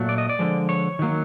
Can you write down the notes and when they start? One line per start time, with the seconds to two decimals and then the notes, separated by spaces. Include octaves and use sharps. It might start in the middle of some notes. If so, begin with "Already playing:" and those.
Already playing: A#2 F#3 A3
0.09 D5
0.18 D#5
0.29 D5
0.39 D3 F3 G#3
0.69 C#5
0.99 D#3 F#3 A#3